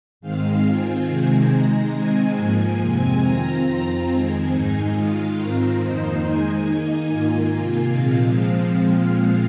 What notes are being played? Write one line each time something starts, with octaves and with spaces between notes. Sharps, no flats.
G#2 D#3 G#3 C4 F5
D#3 C4 F4 G#5
C3 D#3 G#3 C4 G#5
C3 G#3 D#4 A#5
D#3 G#3 C4 D#4 G#5
G#2 F3 A#3 G#5
F2 C3 G#3 C4 G#5
D#3 C4 F4 A#5
F2 F3 C4 F4 A#5
F2 D#3 G#3 C4 G#5
G#2 G#3 D#4 G#5
D#3 G#3 F4 F5
G#2 D#3 C4 F4 A#4
F2 D#3 A#3 D#4 C5
D#3 G#3 D#4 G#5
D#3 A#3 D#4
G#2 D#3 A#3 F4
C3 D#3 A#3 F4 G#5
A#2 F3 G#3 C4 F5